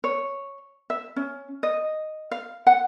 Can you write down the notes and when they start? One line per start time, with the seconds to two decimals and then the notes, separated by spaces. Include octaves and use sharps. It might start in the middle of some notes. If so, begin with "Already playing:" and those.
0.04 C#5
0.90 E5
1.16 C#4
1.63 D#5
2.31 F5
2.67 F#5